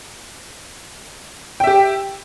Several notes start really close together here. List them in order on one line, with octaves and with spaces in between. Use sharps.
G5 E5 G4